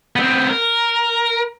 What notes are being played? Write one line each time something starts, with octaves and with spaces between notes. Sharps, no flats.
B3 C4
A#4